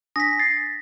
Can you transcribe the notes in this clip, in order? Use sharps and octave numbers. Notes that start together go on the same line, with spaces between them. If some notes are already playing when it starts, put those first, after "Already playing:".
D4 G#5 D#6 A#6 B6
A6 C7